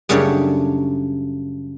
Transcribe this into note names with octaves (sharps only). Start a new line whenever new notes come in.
F#2 C#3 G3 A3 D4 C#5